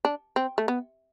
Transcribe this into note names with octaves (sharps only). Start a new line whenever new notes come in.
D4
C4
A3
B3